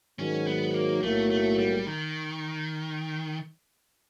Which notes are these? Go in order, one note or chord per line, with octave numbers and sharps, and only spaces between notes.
G#2 D#3 F#3 C#4
B3
A#3
B1 A2 F#3 A3 A#3
A3
G3
D#3